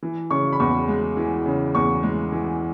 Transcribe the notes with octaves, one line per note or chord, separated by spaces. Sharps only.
E3
C#3 C#6
B5
E2 C#6
G#3
E3
C#3
E2 C#6
G#3
E3